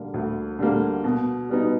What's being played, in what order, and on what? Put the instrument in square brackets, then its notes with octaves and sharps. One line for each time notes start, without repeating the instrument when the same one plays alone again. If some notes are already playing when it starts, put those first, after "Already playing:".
Already playing: [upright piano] D3 G3 A#3
D2
D3 G3 A#3
B2
G3 B3 D#4